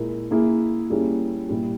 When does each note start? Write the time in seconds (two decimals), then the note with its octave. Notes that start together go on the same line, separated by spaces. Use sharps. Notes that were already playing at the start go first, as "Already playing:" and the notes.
Already playing: A#2 G#3 E4 A#4
0.31 A#3 E4 G#4
0.90 G3 A#3 C#4 E4 G#4
1.49 A#2 G3 A#3 E4 G4